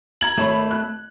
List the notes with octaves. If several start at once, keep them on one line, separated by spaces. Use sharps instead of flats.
A#5 G#6 F#7
G#1 A3 C#5 B5
F#6